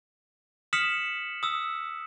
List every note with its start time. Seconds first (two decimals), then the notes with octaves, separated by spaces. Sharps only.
0.73 D#6 F6 B6 C#7 E7 F#7
1.43 D#6 E6